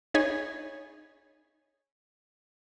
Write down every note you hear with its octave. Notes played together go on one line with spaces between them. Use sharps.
D#4 G#4 C#5 G#5 B5